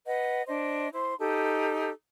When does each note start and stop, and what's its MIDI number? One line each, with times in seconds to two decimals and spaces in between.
0.05 0.42 71
0.05 0.42 75
0.05 0.42 78
0.47 0.88 62
0.47 0.88 72
0.47 0.88 75
0.94 1.15 64
0.94 1.15 72
0.94 1.15 84
1.19 1.90 63
1.19 1.90 67
1.19 1.90 69